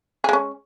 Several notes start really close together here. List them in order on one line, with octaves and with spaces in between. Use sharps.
G#4 G#3 C#4